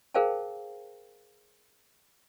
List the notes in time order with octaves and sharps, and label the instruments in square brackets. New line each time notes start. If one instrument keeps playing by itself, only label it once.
[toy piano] G#4 A#4 C5 F5 G5 A5